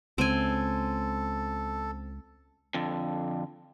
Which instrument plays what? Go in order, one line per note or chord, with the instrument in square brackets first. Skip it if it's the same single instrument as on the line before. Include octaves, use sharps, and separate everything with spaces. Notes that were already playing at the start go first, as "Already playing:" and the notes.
[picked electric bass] C#2 [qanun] C4 G#5 [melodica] A4
[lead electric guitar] F2 D3